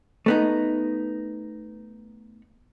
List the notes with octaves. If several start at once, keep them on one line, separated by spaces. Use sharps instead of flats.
A3 B3 D#4